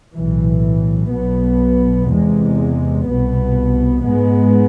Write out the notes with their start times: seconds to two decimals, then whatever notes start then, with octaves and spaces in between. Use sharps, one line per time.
0.15 B1 A2 E3
1.13 B1 B2 B3
2.10 E2 C3 G#3
3.08 C2 B2 B3
4.06 G#2 G#3 B3